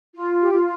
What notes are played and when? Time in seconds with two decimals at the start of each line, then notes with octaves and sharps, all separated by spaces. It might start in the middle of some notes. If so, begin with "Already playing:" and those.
0.15 F4
0.41 G4
0.53 F4